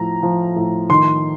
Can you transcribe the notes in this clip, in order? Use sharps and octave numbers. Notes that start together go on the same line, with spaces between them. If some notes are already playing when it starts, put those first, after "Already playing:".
Already playing: A2 F3 A#5
F3
A2
D#3 C6